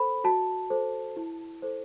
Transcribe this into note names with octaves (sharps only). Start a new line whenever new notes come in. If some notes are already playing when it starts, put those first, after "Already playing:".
Already playing: A4 C5 B5
F#4 A5
A4 C5
E4
A4 C5